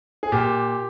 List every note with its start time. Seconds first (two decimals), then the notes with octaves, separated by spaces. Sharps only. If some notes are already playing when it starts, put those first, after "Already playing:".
0.23 G#4
0.32 A#2 G4